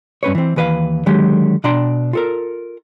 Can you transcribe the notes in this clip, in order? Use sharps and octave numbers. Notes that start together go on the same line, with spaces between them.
G2 C#4 B4 C#5
E3 C4
D#2 E3 B4 D#5 F5
D3 D#3 F#3 G#3 G4
B2 D4 D5 G5 A#5 C6
F4 A4 A#4